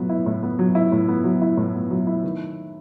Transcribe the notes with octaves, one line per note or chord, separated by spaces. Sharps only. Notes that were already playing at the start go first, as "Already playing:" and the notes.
Already playing: A2 F#3 B3
E4
A2
B3
F#3
E4
A2
B3
F#3
E4
A2
B3
F#3
E4
D#3